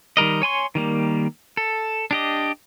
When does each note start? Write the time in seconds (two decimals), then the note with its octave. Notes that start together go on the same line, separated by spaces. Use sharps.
0.17 D#3 G3 A#4 D#5
0.42 C#5 G#5 C6 C#6
0.75 D#3 G3 A#3
1.57 A4
2.11 D4 G4 D#5